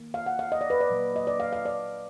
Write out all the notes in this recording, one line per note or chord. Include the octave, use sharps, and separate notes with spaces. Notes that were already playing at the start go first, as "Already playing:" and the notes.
Already playing: D#3 A#3
F5
F#5
F5
D#5
D5
B4
D5
A#2 F#3 A#3
D#5
D5
F5
F5
D5